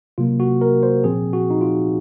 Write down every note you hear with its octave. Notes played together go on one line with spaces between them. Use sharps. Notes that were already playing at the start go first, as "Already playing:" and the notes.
C3 F#3 A#3 F4
F#4
A#4
C5
A#2 F3 C4 G#4
F#4
D#4
F4